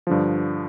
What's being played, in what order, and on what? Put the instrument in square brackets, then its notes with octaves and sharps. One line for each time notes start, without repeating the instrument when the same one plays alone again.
[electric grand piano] G2 D3 F3